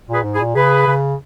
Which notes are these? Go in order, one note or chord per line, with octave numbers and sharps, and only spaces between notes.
A#2 G#4 B4
G#2
E4 G#4
A#2
C#3 G#4 B4
C#3